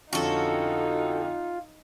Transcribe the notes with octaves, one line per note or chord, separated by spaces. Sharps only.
F2 D3 C#4 D#4 F4 F#4 A4